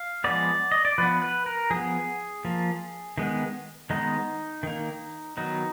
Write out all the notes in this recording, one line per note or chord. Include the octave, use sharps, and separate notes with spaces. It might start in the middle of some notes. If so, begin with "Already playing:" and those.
Already playing: F5
F3 G#3 B3 D5
D#5
D5
F3 B3 B4
B4
A#4
F3 B3 G#4
F3 A#3
D#3 G#3 B3
D#3 G#3 B3 D#4
D#3 A#3
D#3 F#3 B3 D#4